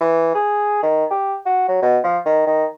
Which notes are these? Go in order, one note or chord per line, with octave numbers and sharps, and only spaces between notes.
E3
G#4
D#3
G4
F#4
F#3
B2
F3
D#3
D#3